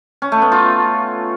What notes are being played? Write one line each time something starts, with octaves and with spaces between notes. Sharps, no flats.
C#4
A3
B3
F4